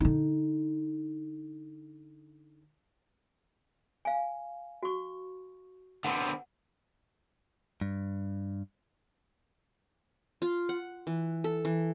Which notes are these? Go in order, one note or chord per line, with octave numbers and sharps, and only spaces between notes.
D3 D#4
F5 G#5
F#4 C#6
D3 B3 C4 F#5
G2
F4
F#5
E3
A4
E3